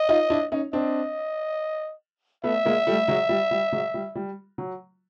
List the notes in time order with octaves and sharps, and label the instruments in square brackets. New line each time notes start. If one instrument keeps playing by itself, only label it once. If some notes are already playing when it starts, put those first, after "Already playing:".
Already playing: [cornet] D#5
[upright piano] D#4 F4
D4 E4
C#4 D#4
[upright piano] C4 D4 [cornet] D#5
[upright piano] A3 B3 [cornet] E5
[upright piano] G#3 A#3
G3 A3
F#3 G#3
G3
G3
F#3 G#3
G3
G3
F#3